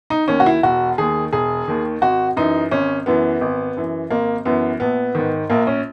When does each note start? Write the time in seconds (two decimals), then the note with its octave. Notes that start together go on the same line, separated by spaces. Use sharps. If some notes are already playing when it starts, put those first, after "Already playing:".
0.10 D#4
0.28 D#2 D#3 C#4
0.40 F#4
0.46 E4
0.63 E1 F#4
0.98 D#2 D#3 G#4
1.33 E1 G#4
1.68 D#2 D#3
2.02 G#1 F#4
2.36 F#2 E3 D#4
2.71 G#1 C#4
3.06 F#2 E3 B3
3.41 G#1
3.76 F#2 E3
4.10 G#1 A#3
4.45 F#2 E3 B3
4.80 A#1 B3
5.15 G#2 D#3
5.50 A#1 A#3
5.67 C#4